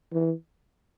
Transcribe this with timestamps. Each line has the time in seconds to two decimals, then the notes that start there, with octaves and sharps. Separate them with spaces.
0.12 E3